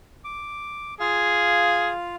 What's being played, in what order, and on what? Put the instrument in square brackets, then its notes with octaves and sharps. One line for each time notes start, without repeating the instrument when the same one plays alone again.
[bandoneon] D6
[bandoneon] F4 F5 [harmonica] G#4